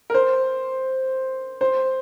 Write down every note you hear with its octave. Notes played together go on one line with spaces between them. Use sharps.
A#4
C5
C5